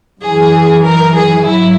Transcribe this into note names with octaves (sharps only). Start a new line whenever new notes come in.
F#2 E3 G#4
A#4
G#4
G#2 F#3 E4